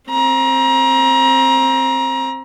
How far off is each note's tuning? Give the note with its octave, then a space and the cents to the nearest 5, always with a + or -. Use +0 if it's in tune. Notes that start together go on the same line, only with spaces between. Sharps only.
C4 +15 A#5 +30